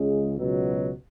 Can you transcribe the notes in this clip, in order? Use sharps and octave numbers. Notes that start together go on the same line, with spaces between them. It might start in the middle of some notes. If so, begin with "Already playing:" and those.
Already playing: C#2 C#3 G#3
C#2 B2 F#3